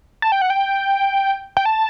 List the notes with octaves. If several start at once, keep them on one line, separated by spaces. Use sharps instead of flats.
A5
G5
F#5
G5
G5
A5